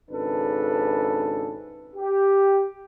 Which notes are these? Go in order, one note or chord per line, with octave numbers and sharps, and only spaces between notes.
G#1 G#2 C#3 D4 A4 B4
G4